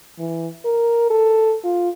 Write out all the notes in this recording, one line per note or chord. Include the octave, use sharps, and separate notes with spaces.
E3
A#4
A4
F4